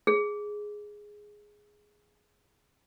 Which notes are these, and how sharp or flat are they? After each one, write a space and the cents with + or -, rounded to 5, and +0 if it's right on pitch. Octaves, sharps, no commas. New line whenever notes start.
G#4 +0